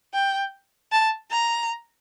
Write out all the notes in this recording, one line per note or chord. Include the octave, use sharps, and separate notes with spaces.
G5
A5
A#5